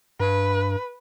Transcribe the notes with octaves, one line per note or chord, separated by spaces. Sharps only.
G2 B4